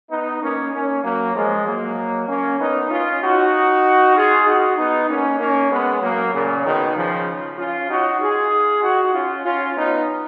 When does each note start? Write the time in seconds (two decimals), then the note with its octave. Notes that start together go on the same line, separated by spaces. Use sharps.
0.10 B3 D#4
0.41 A#3 C#4
0.73 A#3 C#4
1.04 F#3 A#3
1.35 F3 G#3
1.67 F#3 A#3
2.29 A#3 C#4
2.60 B3 D#4
2.91 C#4 F4
3.22 D#4 F#4
4.16 F4 G#4
4.47 D#4 F#4
4.78 B3 D#4
5.09 A#3 C#4
5.40 A#3 C#4
5.71 G#3 B3
6.02 F#3 A#3
6.33 A#2 C#3
6.65 B2 D#3
6.96 C#3 F3
7.58 C#4 F4
7.89 D#4 F#4
8.20 F4 G#4
8.83 D#4 F#4
9.14 C#4 F4
9.45 C#4 F4
9.76 B3 D#4